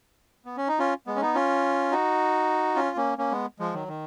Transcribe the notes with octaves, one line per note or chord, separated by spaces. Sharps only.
B3
C#4
D#4
C#4 F4
G#3 B3
C#4
B3 D#4
C#4 F4
D#4 F#4
C#4 F4
A#3 C#4
A#3 C#4
G#3 B3
F3 G#3
D#3 F#3
D#3